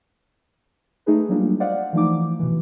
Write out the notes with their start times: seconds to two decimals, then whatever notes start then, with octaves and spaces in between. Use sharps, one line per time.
1.06 A3 D#4 G#4 B4
1.29 F#3 G3 A#3 D4 F4
1.60 C5 D5 D#5 F5 F#5
1.93 E3 F3 A3 D#4 D6
2.39 B2 E3